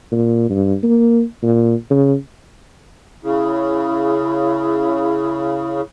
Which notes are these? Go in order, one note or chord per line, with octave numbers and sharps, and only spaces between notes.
A#2
G2
A#3
A#2
C#3
C#3 E4